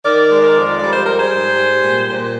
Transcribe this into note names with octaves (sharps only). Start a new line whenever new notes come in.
D#3 A#4 D5
G#3
A#4 D5
F2
G3 D5
C5
G3 A#4
G#4 C5
G#2
G3
A#2
A#2